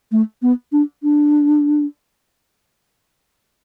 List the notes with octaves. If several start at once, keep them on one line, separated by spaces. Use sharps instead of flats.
A3
B3
D4
D4